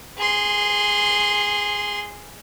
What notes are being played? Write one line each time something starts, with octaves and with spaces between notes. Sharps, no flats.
G#4 C6